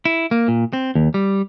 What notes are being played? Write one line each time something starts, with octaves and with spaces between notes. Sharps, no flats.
E4
A#3
A#2
C4
D#2
G3